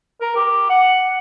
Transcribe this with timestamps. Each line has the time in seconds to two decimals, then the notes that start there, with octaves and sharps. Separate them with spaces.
0.20 A#4
0.36 G4
0.69 F#5